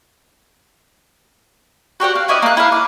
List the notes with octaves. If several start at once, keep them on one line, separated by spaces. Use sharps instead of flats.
F#4 G4 D5 F#5
F5
C#4 E4 D5 D#5
A#3 F#6
E4 F5
D6